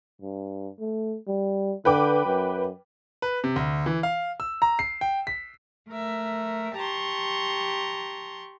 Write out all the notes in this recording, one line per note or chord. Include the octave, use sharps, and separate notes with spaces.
G2
A3
G3
D3 B4 G5 D6
F#2
B4
C3
D2
E3
F5
E6
A#5
C7
G5
B6
A3 A#4 E5
G4 A5 A#5 C6 C#6